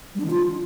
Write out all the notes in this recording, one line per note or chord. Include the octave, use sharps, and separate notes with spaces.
G3
D4
D#3
F4